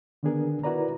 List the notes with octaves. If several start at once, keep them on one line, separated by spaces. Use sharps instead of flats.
D3 D#3 B3 D4 G#4 A#4
E4 F#4 A#4 B4 D5 A#5